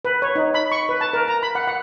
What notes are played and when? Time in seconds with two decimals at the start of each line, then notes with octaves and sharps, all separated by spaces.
0.05 B4
0.22 C#5
0.35 D#4
0.54 B5
0.72 C#6
0.89 B4
1.01 A5
1.13 A#4
1.28 A#5
1.43 B5
1.55 F#5
1.67 F#5